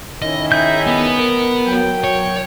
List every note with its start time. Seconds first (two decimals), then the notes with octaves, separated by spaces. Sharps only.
0.22 D#3 C#4 E4 D#5
0.52 D#4 G#4 E5 G6
0.87 B3
1.19 A#4
1.67 F#3 G5
2.04 C#5